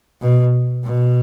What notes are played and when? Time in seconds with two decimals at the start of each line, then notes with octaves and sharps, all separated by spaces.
0.22 B2
0.85 B2